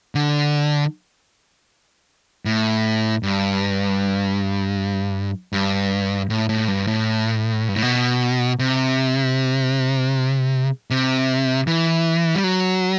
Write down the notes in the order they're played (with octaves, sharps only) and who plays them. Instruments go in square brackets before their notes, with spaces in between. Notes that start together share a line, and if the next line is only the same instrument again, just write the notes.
[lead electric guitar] D3
A2
G2
G2
A2
A2
G2
A2
G2
A2
B2
C3
C3
E3
G3
F#3